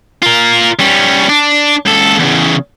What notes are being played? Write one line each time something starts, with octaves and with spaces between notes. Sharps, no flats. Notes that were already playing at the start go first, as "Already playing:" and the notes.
F4 A#4
G3 C#4
D4
C#2 A4
E2 C#3